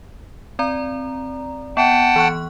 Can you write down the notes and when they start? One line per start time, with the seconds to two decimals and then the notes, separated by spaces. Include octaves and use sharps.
0.59 C4 D5 A#5
1.77 B3 F#5 G5 A5
2.16 E3 C#6 F#6